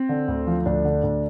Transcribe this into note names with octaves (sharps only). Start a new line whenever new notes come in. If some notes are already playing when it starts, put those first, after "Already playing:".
Already playing: C4
D3
D2
F3
D2 D4
D3
D2